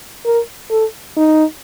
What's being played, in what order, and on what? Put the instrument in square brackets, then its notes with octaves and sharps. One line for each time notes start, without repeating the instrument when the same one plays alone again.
[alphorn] A#4
A4
D#4